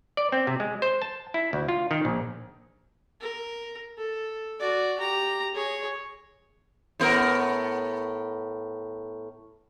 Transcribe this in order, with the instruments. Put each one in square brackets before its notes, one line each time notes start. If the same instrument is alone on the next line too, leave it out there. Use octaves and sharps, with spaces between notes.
[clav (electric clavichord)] D5
C4
C3
G#3
C5
A5
E4
D2
F4
D#3
A#1
[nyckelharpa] A#4
A4
F#4 D5
G4 A#5
G#4 C#5
[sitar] A2 B3 A#4